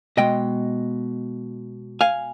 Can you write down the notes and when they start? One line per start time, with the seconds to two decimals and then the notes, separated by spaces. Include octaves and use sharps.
0.17 B2 G#3 D#5 G5
2.01 F5 G#5